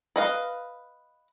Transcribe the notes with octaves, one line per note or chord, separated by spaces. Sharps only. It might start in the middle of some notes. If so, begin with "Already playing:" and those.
B4 D#5 F5